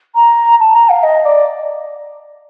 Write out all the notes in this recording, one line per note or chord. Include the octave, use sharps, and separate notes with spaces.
A#5
A5
A#5
F5
D#5
D5